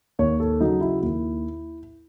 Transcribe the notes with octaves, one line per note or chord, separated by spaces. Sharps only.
D#2 C#5
A4
C#3 F#3 D#4
E4
D#2 E4